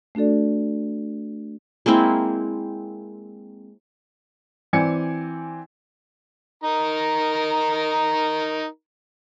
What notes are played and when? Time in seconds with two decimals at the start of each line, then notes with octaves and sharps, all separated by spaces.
0.15 A3 D4 F#4 A4 D5
1.86 G#3 A#3 C4 E4
4.73 E3 C4 D5 G#5 G#6 C#7
6.64 D#4 A#4 A#5